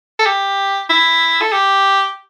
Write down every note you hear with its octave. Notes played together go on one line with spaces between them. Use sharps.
A4
G4
E4
A4
G4